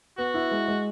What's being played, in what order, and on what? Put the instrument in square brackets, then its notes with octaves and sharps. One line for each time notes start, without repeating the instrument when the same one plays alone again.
[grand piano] B3 [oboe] F#4
[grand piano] E4
G#3
G#3